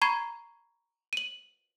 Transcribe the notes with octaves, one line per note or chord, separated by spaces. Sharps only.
A#5 B5 C#6 G#6 C7
D#7 F#7